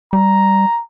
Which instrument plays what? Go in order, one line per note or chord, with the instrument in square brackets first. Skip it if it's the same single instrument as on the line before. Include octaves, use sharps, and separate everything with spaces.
[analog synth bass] G3 [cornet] A#5